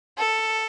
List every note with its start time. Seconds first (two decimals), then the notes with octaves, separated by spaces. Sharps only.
0.18 A4